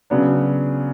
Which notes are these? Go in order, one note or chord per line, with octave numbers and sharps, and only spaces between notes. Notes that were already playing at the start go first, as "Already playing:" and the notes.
C#3 F#3 B3 D4